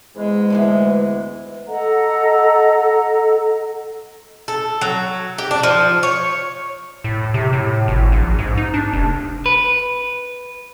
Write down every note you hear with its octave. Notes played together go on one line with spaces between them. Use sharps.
E2 G#2 G#3
D2 E3 B3
A4 D#5 F#5 A#5
A4
F#3
G4
D4
F3
C#5
A2
C3
A2
G#1
A#1
G#2
D#4
D4
F1
B4